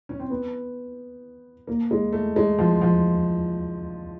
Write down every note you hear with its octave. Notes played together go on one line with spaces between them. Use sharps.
C#4
C4
B3
A#3
G#3
A3
G#3
F3
F3